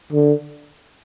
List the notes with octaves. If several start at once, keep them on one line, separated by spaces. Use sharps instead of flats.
D3